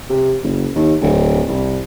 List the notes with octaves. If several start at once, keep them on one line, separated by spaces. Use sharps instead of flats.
C3
F#1
D#2
D1
C2